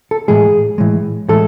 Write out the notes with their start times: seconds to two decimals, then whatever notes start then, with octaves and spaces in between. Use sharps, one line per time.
0.11 A4
0.28 A2 E3 G#3 G#4
0.78 A2 E3 G#3
1.29 A2 E3 G#3 A4